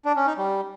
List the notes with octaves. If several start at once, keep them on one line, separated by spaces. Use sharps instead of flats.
D4
C#4
D#4
G3